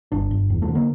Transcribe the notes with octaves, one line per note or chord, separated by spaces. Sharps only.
G1 D4
G1
E2
A3
D3
A#3